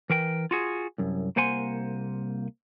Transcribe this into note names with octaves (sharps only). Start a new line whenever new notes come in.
E3 A#4 G5
F4 F#4 G#4
C2 F#2
C2 A#3 C5 F#5 G#5 C6